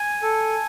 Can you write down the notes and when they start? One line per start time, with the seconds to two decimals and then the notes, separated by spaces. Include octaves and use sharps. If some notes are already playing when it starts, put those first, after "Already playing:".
Already playing: G#5
0.22 A4